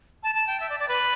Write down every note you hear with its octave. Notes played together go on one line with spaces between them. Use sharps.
A5
A5
G5
E5
D5
D5
B4